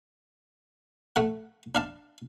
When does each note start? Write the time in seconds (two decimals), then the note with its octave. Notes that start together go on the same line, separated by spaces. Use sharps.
1.16 A3 F#5
1.75 D4 F5 A5